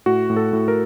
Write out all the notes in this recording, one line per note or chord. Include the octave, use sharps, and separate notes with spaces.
A2 F#4
A2
A4
A2
A#4